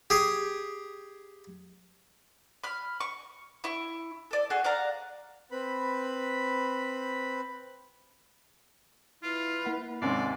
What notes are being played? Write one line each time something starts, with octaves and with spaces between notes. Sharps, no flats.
G4 G#4
B5 F6
C#6
E4 C#6
A4 D5
F#4 G#4 A4
D5 F5 F#5 A#5
C4 B4 B5
E4 F4 B4
A#3 F#5 B5
D#2 G#2 C3 C#4 D5 C7